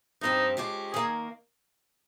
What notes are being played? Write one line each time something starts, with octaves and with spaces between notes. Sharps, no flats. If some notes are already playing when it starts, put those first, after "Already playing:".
G2 F3 C4 D#4 G4
F3 G#3 C#4 G4
D#3 A#3 G#4